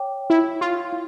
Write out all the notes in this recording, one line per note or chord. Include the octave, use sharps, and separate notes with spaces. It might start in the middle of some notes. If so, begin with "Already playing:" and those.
Already playing: C#5 G5 D6
E4
F4
E4